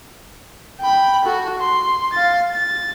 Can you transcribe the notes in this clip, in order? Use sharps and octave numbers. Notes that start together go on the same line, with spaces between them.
G5 B5
F#4 A4
C6
F5 A6
A6